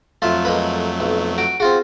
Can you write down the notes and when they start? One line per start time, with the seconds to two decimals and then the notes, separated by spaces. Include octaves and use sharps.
0.22 F2 F#3 A3 F4 E5
0.45 G#3 A#3 B4
1.00 B1
1.38 F#4 D7
1.60 C4 F4 F#4 G#4